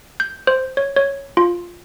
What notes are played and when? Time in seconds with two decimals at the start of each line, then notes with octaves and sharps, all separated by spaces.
0.20 G6
0.47 C5
0.77 C#5
0.96 C#5
1.37 F4